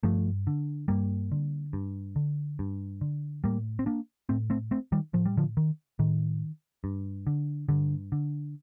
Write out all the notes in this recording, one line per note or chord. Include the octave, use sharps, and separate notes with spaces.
G2 F3 A3
D3
G2 G3 A#3
D3
G2
D3
G2
D3
A2 G3 A#3
C4
A#3 D4
A2 A3 C4
A3 C4
A3 C4
D#3 G3
A2 F3
G3
D3 F3
D#3
A2 D#3
G2
D3
G2 D3
D3